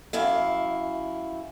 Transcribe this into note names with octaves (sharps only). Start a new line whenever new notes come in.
F#2 E4 F5